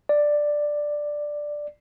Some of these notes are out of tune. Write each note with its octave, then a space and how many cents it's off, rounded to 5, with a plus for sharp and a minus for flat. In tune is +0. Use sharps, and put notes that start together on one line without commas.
D5 +5